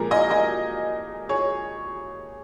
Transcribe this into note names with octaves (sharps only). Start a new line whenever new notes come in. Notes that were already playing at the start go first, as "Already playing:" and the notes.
Already playing: A#2 F3 G#3 G#4 A#4
D#5 G#5
D#5 G#5
G#4 C#5